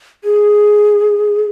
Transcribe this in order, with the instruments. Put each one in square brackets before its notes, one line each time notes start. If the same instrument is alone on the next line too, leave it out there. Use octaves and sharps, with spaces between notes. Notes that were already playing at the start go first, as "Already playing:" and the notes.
[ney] G#4